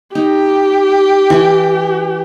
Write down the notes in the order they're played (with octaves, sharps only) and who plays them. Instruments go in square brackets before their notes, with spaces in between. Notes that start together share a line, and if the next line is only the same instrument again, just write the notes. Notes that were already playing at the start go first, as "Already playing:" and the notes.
[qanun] D#4 A#5 [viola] G4
[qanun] E3